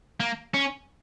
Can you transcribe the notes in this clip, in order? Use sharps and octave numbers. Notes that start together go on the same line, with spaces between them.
A#3
C#4